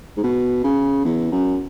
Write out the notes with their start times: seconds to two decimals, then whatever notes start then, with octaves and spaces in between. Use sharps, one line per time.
0.17 G#2
0.23 B2
0.64 C#3
1.05 E2
1.32 F#2